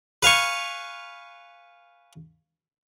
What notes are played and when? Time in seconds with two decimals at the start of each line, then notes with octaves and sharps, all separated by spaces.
0.23 B4 F5 G#5 C#6